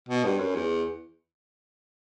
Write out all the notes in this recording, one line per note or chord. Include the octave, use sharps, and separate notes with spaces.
B2
G2
F#2
E2